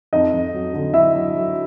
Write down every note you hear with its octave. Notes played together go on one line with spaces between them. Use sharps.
F2 D#4 D#5
F2
F#3
D3
F#3 E4 E5
F#3
F#3